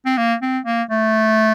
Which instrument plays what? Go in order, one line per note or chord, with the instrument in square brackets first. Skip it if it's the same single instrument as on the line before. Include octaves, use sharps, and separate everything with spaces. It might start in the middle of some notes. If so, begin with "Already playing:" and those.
[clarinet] C4
A#3
C4
A#3
A3